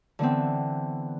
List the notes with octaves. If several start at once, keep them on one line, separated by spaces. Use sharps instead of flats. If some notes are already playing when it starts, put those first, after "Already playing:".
D3 E3 B3 C4